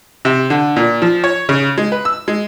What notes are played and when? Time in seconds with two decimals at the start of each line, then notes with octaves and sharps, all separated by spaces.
0.25 C3
0.50 D3
0.76 A#2
1.02 F3
1.24 C#5
1.49 C#3
1.78 G#3
1.92 B4
2.05 E6
2.28 G#3